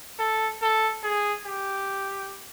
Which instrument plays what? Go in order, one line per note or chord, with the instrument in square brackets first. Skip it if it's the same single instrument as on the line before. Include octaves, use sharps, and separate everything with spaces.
[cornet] A4
A4
G#4
G4